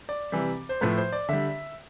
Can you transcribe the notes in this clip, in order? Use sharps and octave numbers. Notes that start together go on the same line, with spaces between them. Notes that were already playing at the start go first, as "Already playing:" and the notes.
D5
C3 E3 G3
C5
A2 F3 A3 B4
C5
D5
D3 G3 E5